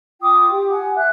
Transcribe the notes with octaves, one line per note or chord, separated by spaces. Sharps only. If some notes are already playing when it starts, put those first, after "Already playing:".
F4 G5 D6 D#6
G4
F#5 G#5
E5 F#5 F#6